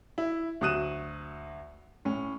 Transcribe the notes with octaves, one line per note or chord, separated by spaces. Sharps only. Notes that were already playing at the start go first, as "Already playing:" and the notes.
E4
D2 F#3 D#6 F#6 D#7 E7
A2 C#4